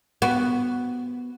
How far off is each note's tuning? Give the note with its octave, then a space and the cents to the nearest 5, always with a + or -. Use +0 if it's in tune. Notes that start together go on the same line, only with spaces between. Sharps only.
B3 +0 F#4 +0